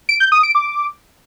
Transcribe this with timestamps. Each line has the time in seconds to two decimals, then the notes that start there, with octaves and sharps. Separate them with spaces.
0.09 D7
0.20 G6
0.32 D#6
0.43 D7
0.55 D6